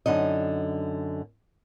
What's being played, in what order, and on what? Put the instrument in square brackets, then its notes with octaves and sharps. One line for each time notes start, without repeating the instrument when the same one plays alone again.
[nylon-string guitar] F#2 D3 D#4 D#5